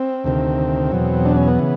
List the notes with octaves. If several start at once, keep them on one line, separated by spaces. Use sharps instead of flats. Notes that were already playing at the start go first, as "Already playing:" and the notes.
Already playing: C4
D2 C3 D#3
E2 B2 F#3
D4
C#4
B3
C#3 E3